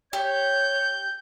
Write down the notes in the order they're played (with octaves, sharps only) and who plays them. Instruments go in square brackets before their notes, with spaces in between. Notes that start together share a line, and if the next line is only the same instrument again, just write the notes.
[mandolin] G4 [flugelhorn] C#5 [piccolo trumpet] G6